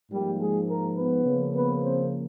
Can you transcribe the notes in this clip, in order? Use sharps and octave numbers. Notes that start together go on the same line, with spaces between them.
G#2 F3 G3 A#3 G4
G#3 G#4
A#3 A#4
B3 B4
C#3 F3 A#3
B3 B4
C4 C5